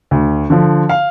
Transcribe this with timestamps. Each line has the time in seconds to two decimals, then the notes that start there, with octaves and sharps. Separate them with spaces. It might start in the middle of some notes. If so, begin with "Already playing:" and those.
0.11 D2
0.50 D3 F3
0.89 F5